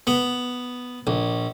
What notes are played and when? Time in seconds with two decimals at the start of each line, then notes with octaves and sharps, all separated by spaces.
0.07 B3
1.07 A#1